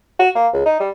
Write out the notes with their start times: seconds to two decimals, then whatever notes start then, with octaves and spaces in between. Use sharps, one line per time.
0.19 F#4
0.35 A#3
0.54 C#2
0.66 D#4
0.80 G3